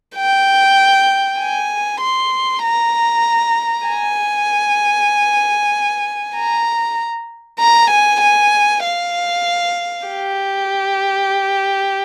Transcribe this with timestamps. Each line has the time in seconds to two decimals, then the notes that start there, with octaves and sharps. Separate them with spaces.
0.16 G5
1.40 G#5
2.01 C6
2.63 A#5
3.88 G#5
6.36 A#5
7.60 A#5
7.91 G#5
8.21 G#5
8.84 F5
10.07 G4